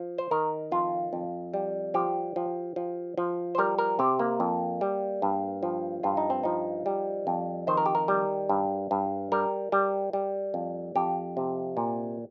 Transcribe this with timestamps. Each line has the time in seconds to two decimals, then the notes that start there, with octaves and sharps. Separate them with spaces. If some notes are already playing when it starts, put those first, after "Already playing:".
Already playing: F3
0.18 C5
0.31 D#3 A#4
0.71 F2 F4
1.13 F2
1.54 G3
1.94 F3 G4
2.36 F3
2.76 F3
3.18 F3
3.55 C5
3.58 G3 A#4
3.78 A#4
3.99 C3 G4
4.19 A#3
4.40 F2
4.81 G3
5.22 G2
5.63 F3
6.03 G2 F4
6.17 D#4
6.30 C4
6.43 F3 D#4
6.86 G3
7.27 F2
7.67 D#3 C5
7.77 A#4
7.86 G4
7.95 A#4
8.08 G3
8.49 G2
8.91 G2
9.32 G3 A#4
9.72 G3
10.13 G3
10.54 F2
10.96 F2 G4
11.37 C3
11.77 A#2